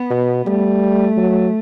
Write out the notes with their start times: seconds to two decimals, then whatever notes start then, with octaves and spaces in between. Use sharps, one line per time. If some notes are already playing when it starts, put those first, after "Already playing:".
Already playing: B3
0.10 B2
0.46 G3 A3
1.17 F#3